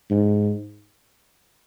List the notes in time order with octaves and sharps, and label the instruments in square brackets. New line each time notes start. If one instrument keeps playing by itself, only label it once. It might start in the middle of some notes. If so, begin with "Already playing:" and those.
[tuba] G#2